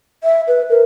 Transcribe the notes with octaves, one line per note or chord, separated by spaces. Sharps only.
E5
B4
A#4